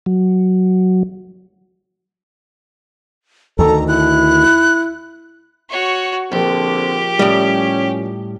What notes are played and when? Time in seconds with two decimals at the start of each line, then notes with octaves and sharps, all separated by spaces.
0.06 F#3
3.59 D2 D#3 A4 A#5
3.88 E4 F#6
5.70 F#4 C#5
6.32 A#1 D3 C4 G4
7.19 A2 G3 C#4